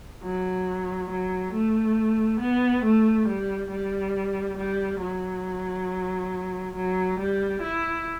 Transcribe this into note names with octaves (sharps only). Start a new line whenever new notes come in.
F#3
F#3
A3
B3
A3
G3
G3
G3
F#3
F#3
G3
E4